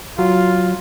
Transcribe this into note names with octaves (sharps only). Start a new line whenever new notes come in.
F#3 F4